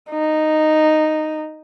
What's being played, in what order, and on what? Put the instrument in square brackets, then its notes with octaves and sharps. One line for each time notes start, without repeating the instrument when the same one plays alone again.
[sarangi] D#4